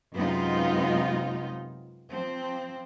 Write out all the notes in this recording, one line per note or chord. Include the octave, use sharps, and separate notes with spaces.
F#2 C3 G#3 B3 D#4 F4
F3 C4